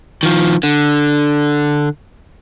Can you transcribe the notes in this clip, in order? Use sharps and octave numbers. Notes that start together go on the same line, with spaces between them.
D#3 F3
D3